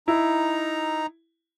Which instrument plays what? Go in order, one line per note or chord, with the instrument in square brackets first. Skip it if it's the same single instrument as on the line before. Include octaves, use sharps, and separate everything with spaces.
[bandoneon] D#4 A#5 [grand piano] E4